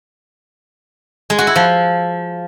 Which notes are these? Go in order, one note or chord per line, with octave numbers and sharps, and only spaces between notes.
G#3
F#4
E4
F3